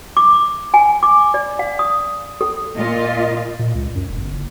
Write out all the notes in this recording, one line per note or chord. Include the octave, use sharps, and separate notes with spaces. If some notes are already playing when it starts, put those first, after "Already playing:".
D6
G#5
D6
D5
F5
D#6
A4
A#2 F4 D#5
A#2
C#2
F#2
E1
G1
F#1